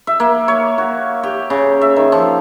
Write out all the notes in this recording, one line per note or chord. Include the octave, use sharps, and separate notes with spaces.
E5
A#3
C#5
F#4
G4
C#3
E5
D#3
F3